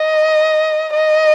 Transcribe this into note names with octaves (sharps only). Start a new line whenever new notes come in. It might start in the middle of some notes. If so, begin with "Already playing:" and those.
Already playing: D#5
D#5